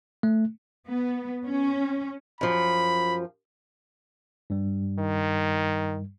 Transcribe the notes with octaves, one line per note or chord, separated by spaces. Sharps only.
A3
B3
C#4
F#2 F3 B5
G2 G3
D#3